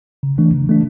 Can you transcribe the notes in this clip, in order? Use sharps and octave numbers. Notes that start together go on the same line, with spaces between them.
C#3
E3 A3 D4
C#3
E3 A3 D4